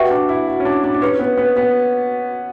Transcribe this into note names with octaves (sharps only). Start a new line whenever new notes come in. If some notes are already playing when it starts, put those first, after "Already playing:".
Already playing: F#4 G4 B4 E5 G5 C#6
D4
E4
F#4
C#4
D4
D4
D4
C#4 E4 G4 B4
B3
B3
B3